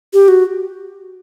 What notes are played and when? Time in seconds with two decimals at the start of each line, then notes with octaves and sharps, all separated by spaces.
0.13 G4
0.28 F#4